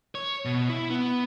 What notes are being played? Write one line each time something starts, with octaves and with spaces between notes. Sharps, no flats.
C#5
B2
E4
B3